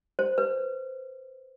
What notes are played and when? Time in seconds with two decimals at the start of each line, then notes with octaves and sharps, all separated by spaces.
0.19 C5
0.38 B4